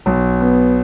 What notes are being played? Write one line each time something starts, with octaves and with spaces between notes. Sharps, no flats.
B1
B3